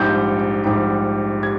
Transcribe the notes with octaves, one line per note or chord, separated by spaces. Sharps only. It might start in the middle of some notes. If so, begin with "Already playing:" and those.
Already playing: A#1 G#2 G3 G6
A#1 G#2 G3
G3 G#6